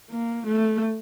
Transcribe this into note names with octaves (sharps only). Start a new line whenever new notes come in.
A#3
A3